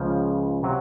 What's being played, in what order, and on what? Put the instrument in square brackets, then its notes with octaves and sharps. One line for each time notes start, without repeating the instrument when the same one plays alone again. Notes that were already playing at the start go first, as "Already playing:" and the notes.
Already playing: [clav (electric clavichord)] C#2 C#3 F3
C3 F#3